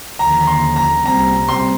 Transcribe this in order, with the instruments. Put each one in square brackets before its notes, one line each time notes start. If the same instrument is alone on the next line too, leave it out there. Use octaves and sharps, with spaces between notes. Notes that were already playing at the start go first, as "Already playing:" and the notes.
[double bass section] D#2 D3 F3 [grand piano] A#5
[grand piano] A#5
C6
A#5
[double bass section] C2 A#2 G3 C4 [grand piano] A#5
[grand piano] C6